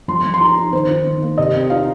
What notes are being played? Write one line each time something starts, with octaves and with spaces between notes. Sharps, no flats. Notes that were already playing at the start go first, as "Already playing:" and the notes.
F3 C6
F3
C6
D#4 A#5
D#4
D#3 C5
D#4
D#3
A#3
C3 D#5
C4
D#4 F5